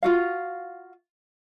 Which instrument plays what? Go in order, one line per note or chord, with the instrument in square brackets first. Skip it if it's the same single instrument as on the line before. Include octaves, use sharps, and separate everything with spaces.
[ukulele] F4 F#4 F5